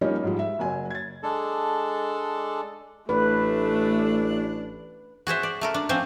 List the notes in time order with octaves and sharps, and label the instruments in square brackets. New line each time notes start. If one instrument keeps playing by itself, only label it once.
[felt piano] F3 G3 A#3 C#4 D#4
G#2 F3 G3
E5
F#1 F#3 G#5
G#6 A6
[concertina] G#3 D4 A4
[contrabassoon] A1 [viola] A3 [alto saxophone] D4 [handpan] B4
[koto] F#4 G#4 C5 E5
D5
A3 A4 A#4
D4
F3 C4 C#4 C5